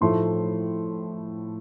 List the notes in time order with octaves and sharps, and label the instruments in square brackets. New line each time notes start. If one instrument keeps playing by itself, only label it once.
[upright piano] A2 F3 A3 D#4 C6